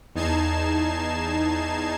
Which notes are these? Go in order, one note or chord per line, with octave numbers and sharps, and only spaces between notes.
E2 D#4 A5 G#6 C7 E7